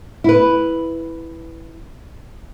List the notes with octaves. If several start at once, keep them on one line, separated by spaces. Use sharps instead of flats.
E4 B4